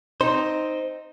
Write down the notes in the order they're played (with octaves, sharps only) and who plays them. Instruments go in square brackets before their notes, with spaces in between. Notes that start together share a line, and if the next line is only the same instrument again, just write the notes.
[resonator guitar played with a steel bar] C4 D#4 [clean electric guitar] C5